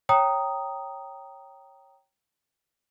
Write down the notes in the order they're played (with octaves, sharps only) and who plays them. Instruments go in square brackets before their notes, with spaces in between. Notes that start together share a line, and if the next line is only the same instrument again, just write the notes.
[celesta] C#5 G5 A#5 D#6